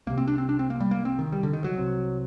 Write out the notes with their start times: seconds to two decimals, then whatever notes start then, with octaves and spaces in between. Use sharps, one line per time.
0.07 C2 C3 A#3
0.18 C4
0.27 D4
0.38 C4
0.49 D4
0.59 C4
0.70 A#3
0.80 G3
0.91 A#3
1.05 C4
1.19 D#3
1.32 G3
1.43 D3
1.53 D#3
1.64 F#3
1.75 C2 C3